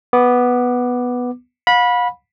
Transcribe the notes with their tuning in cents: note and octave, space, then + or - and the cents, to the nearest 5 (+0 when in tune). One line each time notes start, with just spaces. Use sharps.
B3 +0 D6 +10
F5 +45 B5 -15